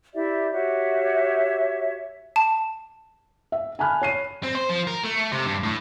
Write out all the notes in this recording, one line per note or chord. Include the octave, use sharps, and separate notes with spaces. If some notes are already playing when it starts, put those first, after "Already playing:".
E4 G4 D5 E5
F#4 G4 C#5 E5
A5
E5
G#5 A5 B5 F6 F#6
C#5 C7 D#7
C4
C5
F3
A#4
A3
C3
G2
A2